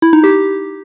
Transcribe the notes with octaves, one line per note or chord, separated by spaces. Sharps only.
E4
D#4
G4